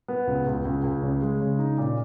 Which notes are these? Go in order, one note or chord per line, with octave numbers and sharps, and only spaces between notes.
B3
C#2
C#2
C#2
C#2
C#3
G#3
C#3
D#4
A#2